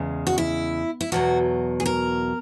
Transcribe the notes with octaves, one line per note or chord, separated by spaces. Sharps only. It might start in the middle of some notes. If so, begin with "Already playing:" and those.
Already playing: E2 C#3 G#3
F#4
E4
E4
E2 B2 F#3 F#4
G#4
A#4